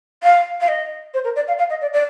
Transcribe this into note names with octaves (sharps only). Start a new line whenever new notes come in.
F5
F5
D#5
C5
A#4
D5
F5
F5
D#5
D5
D5